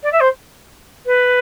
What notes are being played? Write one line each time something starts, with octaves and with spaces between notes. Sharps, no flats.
D5
E5
C5
B4